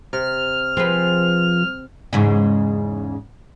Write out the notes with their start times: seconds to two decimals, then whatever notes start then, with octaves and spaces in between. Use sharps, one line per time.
0.13 C3 F6
0.77 F3 C4 G#4 B4
2.13 E2 G#2 C#3